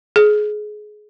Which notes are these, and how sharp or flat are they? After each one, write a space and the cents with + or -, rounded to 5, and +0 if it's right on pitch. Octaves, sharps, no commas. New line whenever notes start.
G#4 +20